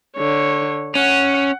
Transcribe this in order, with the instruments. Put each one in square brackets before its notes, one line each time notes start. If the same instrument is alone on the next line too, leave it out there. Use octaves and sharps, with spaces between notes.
[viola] D3 C#5
[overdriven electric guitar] C#4 [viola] F#5